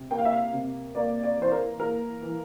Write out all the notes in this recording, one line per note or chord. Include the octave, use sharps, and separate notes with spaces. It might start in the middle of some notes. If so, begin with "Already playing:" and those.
Already playing: C3
A#3 G5
F5
E5
F5
C3
A#3 D5
D5
E3 C5
A#4
A#3 A#4
E3